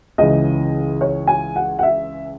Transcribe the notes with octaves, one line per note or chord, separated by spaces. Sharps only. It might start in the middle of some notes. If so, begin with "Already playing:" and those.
C#2 C#3 E3 D#5
C#5
G#5
F#5
F#5
E5